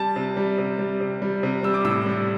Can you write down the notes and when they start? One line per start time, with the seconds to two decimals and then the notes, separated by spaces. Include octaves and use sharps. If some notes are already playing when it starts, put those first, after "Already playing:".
Already playing: G3 A5
0.16 C3
0.37 G3
0.58 C3
0.79 G3
1.00 C3
1.22 G3
1.43 C3
1.63 G3 E6
1.74 D6
1.84 A2 E6
2.06 G3